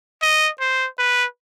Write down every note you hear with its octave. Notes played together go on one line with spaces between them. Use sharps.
D#5
C5
B4